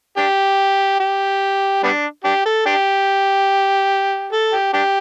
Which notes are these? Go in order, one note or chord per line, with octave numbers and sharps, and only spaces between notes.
D4 G4
G4
G3 B3 D4
D4 G4
A4
D4 G4
A4
G4
D4 G4